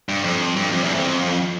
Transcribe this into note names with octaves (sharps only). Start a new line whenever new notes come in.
G2
F2
G2
F2
E2
F2